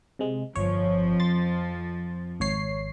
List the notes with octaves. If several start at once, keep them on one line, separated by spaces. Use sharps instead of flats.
C3 G#3
G1 F2 F3 C#5
C6 A6
G#1 C#5 C7